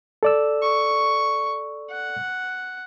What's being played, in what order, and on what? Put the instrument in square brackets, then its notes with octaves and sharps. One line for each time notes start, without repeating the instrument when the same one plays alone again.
[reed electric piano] A4 D5 E6
[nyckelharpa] C#6
F#5